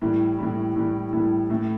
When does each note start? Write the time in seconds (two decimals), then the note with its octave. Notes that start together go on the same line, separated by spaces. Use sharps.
0.01 A2 E3 G3
0.39 A2 E3 G3
0.76 A2 E3 G3
1.13 A2 E3 G3
1.50 A2 E3 A3